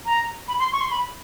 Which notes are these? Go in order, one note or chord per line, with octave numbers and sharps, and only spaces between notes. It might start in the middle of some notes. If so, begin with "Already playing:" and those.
A#5
B5
C6
C#6
C6
B5